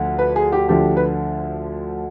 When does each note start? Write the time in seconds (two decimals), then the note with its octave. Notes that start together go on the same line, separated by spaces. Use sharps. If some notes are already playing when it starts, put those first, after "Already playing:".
Already playing: D2 D3 F3
0.19 B4
0.36 G#4
0.52 G4
0.69 D2 D3 F3 G4
0.97 B4